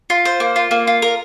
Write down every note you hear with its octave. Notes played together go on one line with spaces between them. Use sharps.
F4
C5
A#3
F4
A#3
F4
A#4